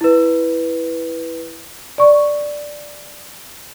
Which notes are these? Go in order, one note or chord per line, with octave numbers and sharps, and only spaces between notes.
E4 B4
D5 C#6